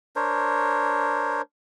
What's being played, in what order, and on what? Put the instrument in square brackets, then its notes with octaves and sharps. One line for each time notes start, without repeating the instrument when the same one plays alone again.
[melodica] D4 A#4 C5 C#5